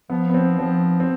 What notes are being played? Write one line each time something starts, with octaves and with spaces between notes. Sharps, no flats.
F3 B3
B3
C4
F3 C4
C4